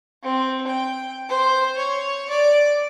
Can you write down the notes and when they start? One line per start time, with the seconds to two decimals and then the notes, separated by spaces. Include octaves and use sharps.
0.23 C4
0.67 G5
1.29 C5
1.77 C#5
2.29 D5